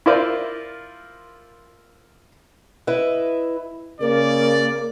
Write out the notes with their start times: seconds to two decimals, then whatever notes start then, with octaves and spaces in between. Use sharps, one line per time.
0.06 E4 F4 A#4 C5 D5
2.87 E4 B4 D#5 E5
4.01 C#3 A#3 A#4 D5